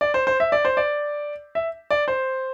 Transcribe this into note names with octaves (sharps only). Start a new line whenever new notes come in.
D5
C5
C5
E5
D5
C5
D5
E5
D5
C5